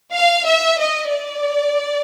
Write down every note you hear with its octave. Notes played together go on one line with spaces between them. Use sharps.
F5
E5
D#5
D5